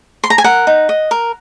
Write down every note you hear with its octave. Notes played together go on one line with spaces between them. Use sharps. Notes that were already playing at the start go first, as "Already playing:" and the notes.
C6
A#5
G#5
A#4 F#5
D#4
D#5
A#4